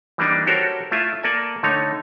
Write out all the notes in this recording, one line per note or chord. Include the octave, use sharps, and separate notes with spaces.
E3 G3 A#3 D4 D#4
F#4 G4 A4 A#4 C5 C#5
A3 E4 F4 E5
A#3 A4 D5 G#5
D3 A3 D#4 C#5